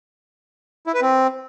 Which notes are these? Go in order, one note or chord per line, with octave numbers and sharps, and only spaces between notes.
E4
B4
C4